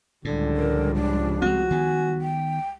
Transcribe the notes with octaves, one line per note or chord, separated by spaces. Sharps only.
C#2 A2 D3 F3 G3
A#4
D4
G#3 C4 F#4
D#3 B3 G#5
G5